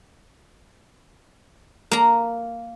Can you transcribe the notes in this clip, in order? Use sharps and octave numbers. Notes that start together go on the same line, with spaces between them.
A#3 A#5